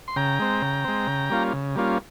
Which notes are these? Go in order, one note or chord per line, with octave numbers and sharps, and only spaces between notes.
C6
C#3 G5 A#5
G#3 C4
C#3
G#3 C4
C#3
G3 A#3 C#4 F4
C#3
G3 A#3 C#4 F4